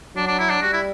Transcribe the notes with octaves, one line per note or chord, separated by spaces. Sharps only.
F#3 D4
D4
E4
D4
G3 F#4
E4